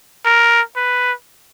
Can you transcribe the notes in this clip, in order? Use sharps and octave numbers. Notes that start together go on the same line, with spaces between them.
A#4
B4